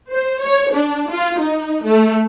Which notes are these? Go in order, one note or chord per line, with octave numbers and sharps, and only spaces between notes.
C5
C#5
D4
F4
D#4
A3